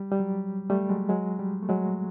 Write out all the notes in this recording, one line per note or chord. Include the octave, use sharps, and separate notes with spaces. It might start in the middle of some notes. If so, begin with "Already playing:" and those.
Already playing: G3
G3
F#3
G3 A3
F#3 G#3
F#3 G#3
G3
A3
F#3 G#3